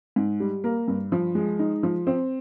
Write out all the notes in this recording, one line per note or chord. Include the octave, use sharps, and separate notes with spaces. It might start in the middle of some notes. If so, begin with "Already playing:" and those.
G#2
G3
A#3
G2
F3
G#3
D#4
F3
C4